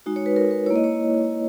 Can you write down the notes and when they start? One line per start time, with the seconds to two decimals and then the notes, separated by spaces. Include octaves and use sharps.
0.06 G#3 D#4 F#4
0.16 C#5
0.26 B4
0.36 A#4
0.51 B4
0.66 A#3 E4 C#5
0.76 D#5
0.84 C#5